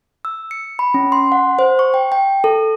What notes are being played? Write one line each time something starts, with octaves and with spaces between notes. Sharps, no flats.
E6
C#7
B5
C#4
C6
F#5
C5
C#6
G5
G5
A4